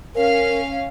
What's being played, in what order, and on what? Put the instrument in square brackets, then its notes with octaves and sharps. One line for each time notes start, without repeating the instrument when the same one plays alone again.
[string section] C#4 F5 [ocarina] A#4